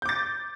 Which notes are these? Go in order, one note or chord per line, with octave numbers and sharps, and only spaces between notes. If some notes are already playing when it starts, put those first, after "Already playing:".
D6 G6 A6